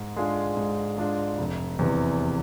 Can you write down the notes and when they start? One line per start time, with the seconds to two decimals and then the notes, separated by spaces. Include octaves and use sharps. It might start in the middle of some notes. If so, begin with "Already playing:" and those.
Already playing: G#2
0.16 G#3 D4 F4 G#4
0.57 G#2
0.98 G#3 D4 F4 G#4
1.38 F1
1.79 E2 C3 E3